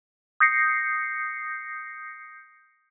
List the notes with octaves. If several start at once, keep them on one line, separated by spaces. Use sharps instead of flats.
D#6 G6 A#6 C7 C#7